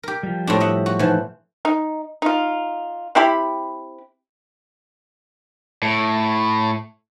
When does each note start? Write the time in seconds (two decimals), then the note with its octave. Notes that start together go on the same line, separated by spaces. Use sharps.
0.03 G4 A#4
0.23 F3 G3
0.47 A2 C4 D4
0.60 D#5 E5 F#5
0.86 F#4
0.99 A#2 E3 F3 D#4 F#5
1.65 D#4
2.22 D#4 F4
3.15 C4 E4 G4 B5
5.82 A2